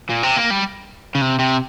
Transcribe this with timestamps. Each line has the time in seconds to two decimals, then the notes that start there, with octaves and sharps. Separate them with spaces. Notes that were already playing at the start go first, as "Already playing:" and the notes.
0.10 A#2
0.23 C3
0.36 A#3
0.50 G3
1.15 C#3
1.21 C3
1.39 C3